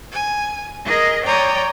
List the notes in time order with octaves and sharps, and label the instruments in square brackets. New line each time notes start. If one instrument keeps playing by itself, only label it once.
[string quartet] G#5
G#4 A#4 D#5
C#5 D5 G5 A#5 D#6